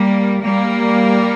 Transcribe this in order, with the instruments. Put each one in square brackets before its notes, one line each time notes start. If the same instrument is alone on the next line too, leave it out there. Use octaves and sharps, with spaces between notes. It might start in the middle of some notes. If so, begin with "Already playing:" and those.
Already playing: [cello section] G3 A#3
G3 A#3